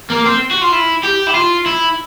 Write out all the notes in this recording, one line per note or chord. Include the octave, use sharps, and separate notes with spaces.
A#3
C4
F#4
F4
E4
G4
E4
F4
E4